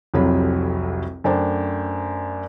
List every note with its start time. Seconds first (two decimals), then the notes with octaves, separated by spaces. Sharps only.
0.14 F1 C2 F2 F#3 C#5 B5
1.24 F#2 A3 D4 C5 G5 A5